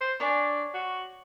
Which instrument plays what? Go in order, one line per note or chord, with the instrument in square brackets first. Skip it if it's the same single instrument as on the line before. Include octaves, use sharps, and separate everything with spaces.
[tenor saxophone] C5
[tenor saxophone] D4 [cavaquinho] C#5 D5 G#5
[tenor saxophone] F#4